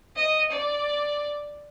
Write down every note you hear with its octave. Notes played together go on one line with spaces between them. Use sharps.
D#5
D5